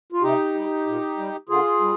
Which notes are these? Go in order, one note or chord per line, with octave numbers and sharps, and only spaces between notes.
F4
C3 D#4 G4
G3
A#2
G3
D3 F4 G#4
G3